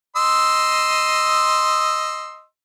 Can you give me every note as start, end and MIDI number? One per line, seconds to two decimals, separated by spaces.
0.16 2.44 75
0.16 2.44 84
0.16 2.44 88